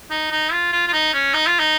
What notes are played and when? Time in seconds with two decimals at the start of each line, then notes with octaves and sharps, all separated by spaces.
0.11 D#4
0.31 D#4
0.52 F4
0.72 F4
0.88 F4
0.93 D#4
1.14 C#4
1.34 D#4
1.47 F4
1.60 D#4